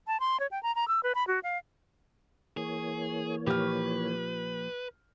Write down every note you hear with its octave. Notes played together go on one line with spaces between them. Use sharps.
A5
C6
C#5
G5
A#5
A#5
E6
B4
B5
F#4
F5
E3 A#3 G#4 C#5
A#2 F3 G4 B4 F6